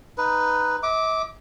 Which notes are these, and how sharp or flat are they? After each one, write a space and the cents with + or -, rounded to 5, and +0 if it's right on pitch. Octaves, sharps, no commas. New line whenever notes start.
D#4 +0 B4 +0
E5 -45 D6 -5